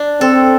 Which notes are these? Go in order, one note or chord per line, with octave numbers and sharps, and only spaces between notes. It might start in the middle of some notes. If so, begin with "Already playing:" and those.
Already playing: D4
C4 A4